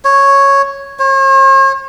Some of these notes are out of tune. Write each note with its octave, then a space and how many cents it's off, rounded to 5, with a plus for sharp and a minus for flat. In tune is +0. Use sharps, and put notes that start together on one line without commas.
C#5 -5
C#5 -45